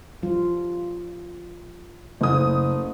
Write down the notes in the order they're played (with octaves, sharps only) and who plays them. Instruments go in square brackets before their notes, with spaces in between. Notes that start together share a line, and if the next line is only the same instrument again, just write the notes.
[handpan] F3 G3 F4
[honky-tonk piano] F#1 D#6 [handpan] A3